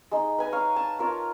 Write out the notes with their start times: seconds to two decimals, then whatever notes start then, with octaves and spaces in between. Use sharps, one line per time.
0.11 G#3 D#4
0.38 B4 G#5 A#5
0.53 C#5 F5
0.76 A5
0.99 F4 A#4 C#5